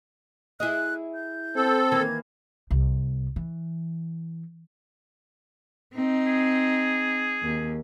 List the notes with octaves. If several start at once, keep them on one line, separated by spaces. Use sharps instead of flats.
E4 G#4 D#5 F#6
G6
C4 A4
D#3 E3 A#3 G#6
C2
E3
C4 D#4
G#4
D#2